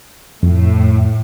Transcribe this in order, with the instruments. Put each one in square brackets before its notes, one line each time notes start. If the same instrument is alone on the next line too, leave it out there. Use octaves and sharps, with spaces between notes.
[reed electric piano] F2 [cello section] A2